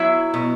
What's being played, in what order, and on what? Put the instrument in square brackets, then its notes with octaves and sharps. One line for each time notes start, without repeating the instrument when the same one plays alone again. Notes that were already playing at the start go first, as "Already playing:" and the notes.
Already playing: [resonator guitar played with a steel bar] F#3 E4 E5
B2